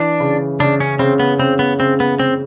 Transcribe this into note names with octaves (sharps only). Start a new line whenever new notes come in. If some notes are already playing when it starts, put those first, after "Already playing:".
Already playing: E3 D4
C#3
C#3 D4
C#4
C#3 C4
B3
C#3 C4
B3
C#3 C4
B3
C#3 C4